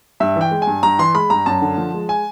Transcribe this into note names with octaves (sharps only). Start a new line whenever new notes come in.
G2 E5
E3
G5
G#3
G#5
G2
G2 A#5
E3 C6
G#3 B5
G2 A#5
F#2 A5
D3
F3
G#3
G#5